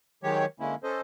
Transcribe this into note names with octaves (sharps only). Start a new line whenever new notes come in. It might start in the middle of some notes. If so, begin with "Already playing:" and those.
D#3 F#3 G#3 G4 C#5
D3 G#3 A#3 C#4 E4
C#4 A4 C5 D#5